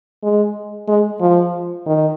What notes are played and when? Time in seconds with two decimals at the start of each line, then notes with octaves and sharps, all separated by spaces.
0.23 G#3
0.88 G#3
1.21 F3
1.86 D#3